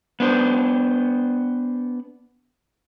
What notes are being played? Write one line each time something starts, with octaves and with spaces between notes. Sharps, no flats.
B3 D4 C5